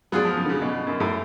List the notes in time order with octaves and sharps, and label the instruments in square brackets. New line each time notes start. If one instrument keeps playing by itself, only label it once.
[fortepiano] F#3 [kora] B3 F4 G#4 D5
[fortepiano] F3
C#3
D3
C#3
B2
F#2
A2